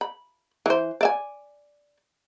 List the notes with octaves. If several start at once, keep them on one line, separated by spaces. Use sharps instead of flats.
B5
E3 C5
D5 E5 G#5